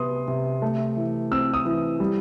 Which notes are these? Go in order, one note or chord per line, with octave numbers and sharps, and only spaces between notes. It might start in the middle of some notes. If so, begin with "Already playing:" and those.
Already playing: C3 B3 C6 D#6
C3
A3
E3
C4 E6
D#6
E3
G3